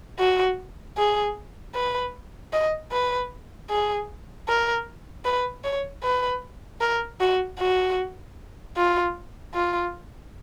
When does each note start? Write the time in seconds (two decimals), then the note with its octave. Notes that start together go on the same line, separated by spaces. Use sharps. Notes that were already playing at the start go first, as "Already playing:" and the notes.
0.19 F#4
0.97 G#4
1.75 B4
2.53 D#5
2.92 B4
3.69 G#4
4.48 A#4
5.25 B4
5.64 C#5
6.03 B4
6.81 A#4
7.20 F#4
7.59 F#4
8.76 F4
9.54 F4